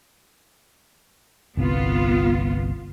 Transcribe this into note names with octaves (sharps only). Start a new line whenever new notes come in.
G1 C2 B3 F4